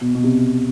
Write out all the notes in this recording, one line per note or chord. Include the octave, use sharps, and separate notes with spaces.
B2
B2
C3